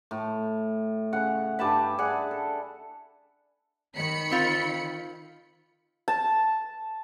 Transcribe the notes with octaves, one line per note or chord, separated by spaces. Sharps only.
A2
C#3 F#5
G2 G3 A5 B5
E4 G#4 D5 F#5
A4
D#3 B5 C#7
C4 F4
A5